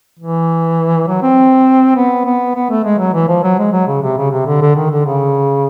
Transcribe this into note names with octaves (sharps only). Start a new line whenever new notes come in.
E3
F#3
C4
B3
B3
B3
A3
G#3
F#3
E3
F3
F#3
G#3
F#3
C#3
C3
C#3
C3
D3
D3
D#3
D3
C#3